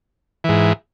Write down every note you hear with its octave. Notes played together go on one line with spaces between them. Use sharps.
G#2 E3